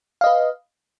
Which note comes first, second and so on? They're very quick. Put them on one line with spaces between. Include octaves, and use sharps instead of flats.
F5 D#5 B4